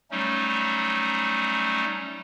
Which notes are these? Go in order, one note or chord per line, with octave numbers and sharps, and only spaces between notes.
F#3 G3 A3 C#4 D#4